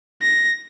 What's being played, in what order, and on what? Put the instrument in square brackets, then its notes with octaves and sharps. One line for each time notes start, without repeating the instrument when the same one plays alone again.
[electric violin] A#6